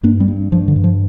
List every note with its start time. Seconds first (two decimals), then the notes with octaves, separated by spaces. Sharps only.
0.03 G2 A#3 D4
0.20 G3 C4
0.28 G2
0.52 G2 F3
0.68 D3
0.76 G2
0.84 F3